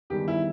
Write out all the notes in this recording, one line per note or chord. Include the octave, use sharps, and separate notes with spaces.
E2 D#3 G3 G4
E4